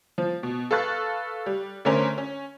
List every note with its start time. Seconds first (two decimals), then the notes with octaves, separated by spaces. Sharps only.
0.18 F3
0.43 B2
0.71 A4 B4 F5 C#6 F#6 A6
1.46 G3
1.85 D3 A3 C#4 A#4 C5
2.18 C#4